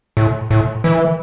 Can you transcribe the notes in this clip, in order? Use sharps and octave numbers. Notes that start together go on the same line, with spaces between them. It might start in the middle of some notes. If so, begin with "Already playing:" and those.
A2
A2
E3